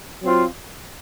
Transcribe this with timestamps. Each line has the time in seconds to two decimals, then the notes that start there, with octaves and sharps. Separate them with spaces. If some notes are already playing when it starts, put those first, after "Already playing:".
0.21 F#3 C4 F4